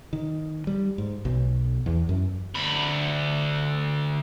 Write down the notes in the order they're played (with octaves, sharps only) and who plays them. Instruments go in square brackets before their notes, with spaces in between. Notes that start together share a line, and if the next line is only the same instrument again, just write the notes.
[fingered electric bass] D#3
G3
G#2
B1
E2
F#2
[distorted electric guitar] D2 B5